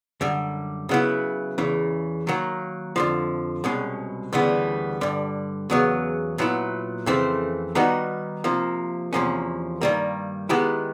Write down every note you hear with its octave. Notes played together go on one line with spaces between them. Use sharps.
F#2 D3 G3
C#3 F#3 B3 E4
E2 C#3 E3
D#3 F#3 A#3
F2 D3 F3
C2 B2 G#3 C#4
D2 C#3 E3 G3 B3
G2 D3 G3
E2 C#3 F#3 B3
A#2 F#3 B3 E4
F2 C#3 E3 A3 C4
D#3 G3 B3 D#4 F#4
C3 F3 A#3
E2 C3 F3 A#3 C#4
G2 D#3 G3 A#3
D#3 G#3 B3 E4 G4